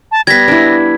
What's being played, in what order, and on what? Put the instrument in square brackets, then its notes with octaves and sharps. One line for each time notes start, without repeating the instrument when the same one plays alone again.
[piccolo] A5
[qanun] G3 B3 [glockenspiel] G#6 B6 [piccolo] A#6
[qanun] D4 E4